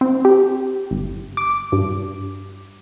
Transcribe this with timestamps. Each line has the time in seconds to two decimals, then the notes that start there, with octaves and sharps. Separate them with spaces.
0.01 C4
0.25 G4
0.91 G1
1.37 D6
1.72 G2